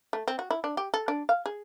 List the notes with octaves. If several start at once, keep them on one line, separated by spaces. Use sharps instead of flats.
A3
C4
F#4
E4
D4
G4
A4
D4
F5
G#4